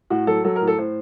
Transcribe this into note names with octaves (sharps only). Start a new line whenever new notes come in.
A2 F#4
F#3 A4
F#3 A4
A#4
A2
A4
A2 C5